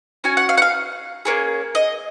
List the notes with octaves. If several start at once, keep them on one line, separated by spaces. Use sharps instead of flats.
C#4 F#4 G#5
F#5
F5
F#5
F5
A#3 C#4 G#4
D#5